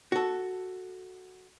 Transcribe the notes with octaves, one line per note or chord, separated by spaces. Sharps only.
F#4 A4